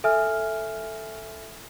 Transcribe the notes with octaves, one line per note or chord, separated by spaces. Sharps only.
A4 E5 G#5 F6